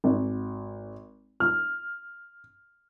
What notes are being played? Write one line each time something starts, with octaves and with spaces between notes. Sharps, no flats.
G#1
F6